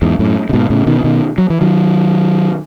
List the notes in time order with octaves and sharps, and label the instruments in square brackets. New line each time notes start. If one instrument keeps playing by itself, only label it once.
[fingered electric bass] E2 G#2
F#2 A2
C#3
G#2 B2
A2 C#3
B2 D#3
E3
B2 D#3
F#3
E3
D#3 F#3